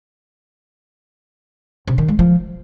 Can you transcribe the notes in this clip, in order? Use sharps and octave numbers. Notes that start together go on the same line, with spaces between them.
C3
D#3
G#3
F3